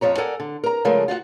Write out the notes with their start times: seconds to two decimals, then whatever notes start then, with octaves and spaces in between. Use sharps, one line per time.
0.01 F2 F3 C#5 A#5
0.18 A4 A#4 D5 F#5 G#5
0.40 D3
0.64 A#4 A#5
0.85 C#3 F3 G#3 A3 A#4
1.08 F4 F#4 D#5 F#5